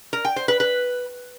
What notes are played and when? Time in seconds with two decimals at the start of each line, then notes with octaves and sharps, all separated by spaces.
0.13 A#4
0.25 G5
0.36 C5
0.48 B4
0.60 B4